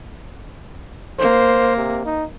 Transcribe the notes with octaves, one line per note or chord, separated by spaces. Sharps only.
A#3 C5
C3
D#4